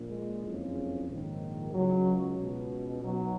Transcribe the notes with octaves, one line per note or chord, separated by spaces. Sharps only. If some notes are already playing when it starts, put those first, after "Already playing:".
Already playing: A#1 A#2
G#3
F#1 F2 C#3
A#1 G#2 D#3
C#2 C#3 F#3
C#2 B2
B1 B2 F#3